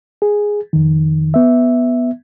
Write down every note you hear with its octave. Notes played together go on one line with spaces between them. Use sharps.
G#4
F2 D#3
B3 E5